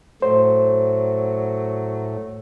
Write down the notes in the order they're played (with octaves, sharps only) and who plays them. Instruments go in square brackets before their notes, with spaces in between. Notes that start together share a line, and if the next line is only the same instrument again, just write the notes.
[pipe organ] A2 A3 [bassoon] F#3 [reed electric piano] C5